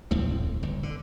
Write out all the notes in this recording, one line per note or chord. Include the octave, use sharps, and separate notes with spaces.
D#1 C2 F2 A2 C4
G1 C4
D3